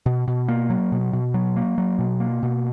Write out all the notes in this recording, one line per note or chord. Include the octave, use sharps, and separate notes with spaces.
B2
B2
A#3
F#3
B2
B2
F#3
A#3
F#3
B2
A#3
B2